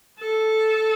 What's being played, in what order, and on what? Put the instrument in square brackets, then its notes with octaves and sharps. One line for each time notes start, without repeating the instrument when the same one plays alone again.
[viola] A4